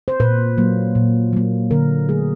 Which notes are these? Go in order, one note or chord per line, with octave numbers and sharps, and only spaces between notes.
C5
A#2 B4
F#3 A#3
A#2
F#3 A#3
D3 A#4
F#3 A3 G#4